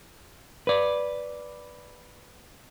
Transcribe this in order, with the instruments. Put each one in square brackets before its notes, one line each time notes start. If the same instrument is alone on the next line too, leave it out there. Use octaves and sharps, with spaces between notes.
[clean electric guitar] B4 D5